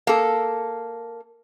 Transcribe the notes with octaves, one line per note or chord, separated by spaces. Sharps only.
A#3 A4